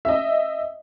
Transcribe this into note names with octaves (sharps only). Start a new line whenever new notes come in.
D#5 E5